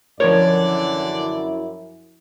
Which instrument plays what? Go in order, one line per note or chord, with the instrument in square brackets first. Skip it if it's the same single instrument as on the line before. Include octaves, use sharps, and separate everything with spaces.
[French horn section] F#2 E4 [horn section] D3 E3 D5 [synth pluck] F3 A#4 [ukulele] C#5